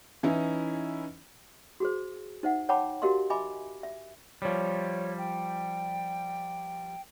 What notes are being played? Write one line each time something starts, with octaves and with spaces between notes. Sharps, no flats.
E3 C#4 D#4 E4
F#4 G#4 C5
D#4 C5 E5 F#5
C#5 F#5 G5 A5 B5 D6
F#4 G4 A#4 D#5 F5 C6
D#5 E5 G#5 B5 D6
E5
F3 G3 C#5
G5